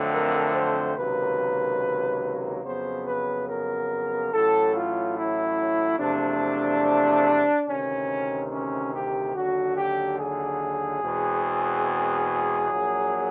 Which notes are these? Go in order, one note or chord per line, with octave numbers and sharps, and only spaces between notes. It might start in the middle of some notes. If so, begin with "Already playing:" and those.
Already playing: F2 D3 F#3 A3 C4
A#4
C5
C#2 C3 D#3 F#3 A#3 B4
F2 C#3 F#3 B3 C5
B4
A#4
A1 A2 F#3 A4
F4
E4
E2 C3 F3 A3 D4
D2 C3 D#3 C#4
C#4
G4
D#2 D3 F#3 F#4
G4
G#4
E2 B2 G#3 C4
A#1 A#2 F#3